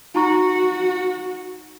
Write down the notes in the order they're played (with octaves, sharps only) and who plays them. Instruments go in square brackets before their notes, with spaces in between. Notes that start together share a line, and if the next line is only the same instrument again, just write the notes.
[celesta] D#4 A#5 C#6 [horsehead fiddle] F#4